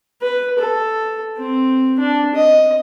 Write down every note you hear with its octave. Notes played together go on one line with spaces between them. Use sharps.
B4
A4
C4
D4
D#5